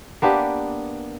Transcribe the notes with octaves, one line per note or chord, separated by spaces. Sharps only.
A#3 B3 D4 G4